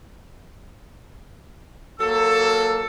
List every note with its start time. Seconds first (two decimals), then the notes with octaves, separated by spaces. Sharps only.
2.00 F#3 A#3 A4 E6